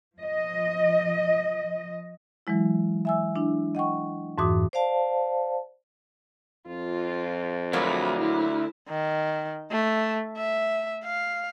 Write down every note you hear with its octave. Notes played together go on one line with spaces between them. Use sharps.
F3 D#5
E3 F#3 G#3 E4
E5 G#5 E6
D4 E4
D#5 F#5 G5 C#6
F2 G#2 E3 F#4 D6 D#6
C5 D5 F5 A5
F2 F4
D2 F#3 G#3 A#3 B5
E4
D#3
A3
E5
F5